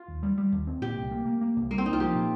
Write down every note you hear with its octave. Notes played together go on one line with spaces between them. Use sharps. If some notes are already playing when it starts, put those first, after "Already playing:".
Already playing: F4
D#2
G3
G3
D#2
C4
A#2 G4
C2
A#3
A#3
A#3
C2
C2 A#3
C4
C2 D#4
F4
F3 G4
A#2